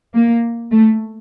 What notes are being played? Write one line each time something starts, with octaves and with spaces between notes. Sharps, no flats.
A#3
A3